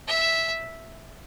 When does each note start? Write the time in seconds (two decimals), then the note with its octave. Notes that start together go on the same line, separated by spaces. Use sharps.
0.08 E5